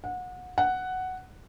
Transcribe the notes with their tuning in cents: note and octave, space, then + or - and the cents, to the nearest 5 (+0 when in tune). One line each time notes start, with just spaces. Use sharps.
F#5 -25
F#5 +5